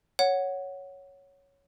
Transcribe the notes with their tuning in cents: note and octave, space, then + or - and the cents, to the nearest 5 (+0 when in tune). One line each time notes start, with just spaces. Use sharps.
C#5 +0 F#5 +0